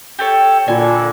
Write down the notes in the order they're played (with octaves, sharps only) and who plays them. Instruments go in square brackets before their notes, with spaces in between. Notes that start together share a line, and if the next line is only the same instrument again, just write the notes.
[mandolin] G4 A4 C#5
[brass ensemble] A#2 D3 [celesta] F4 D5 [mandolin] G#5